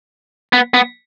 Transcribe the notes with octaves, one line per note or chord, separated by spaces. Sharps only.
B3
B3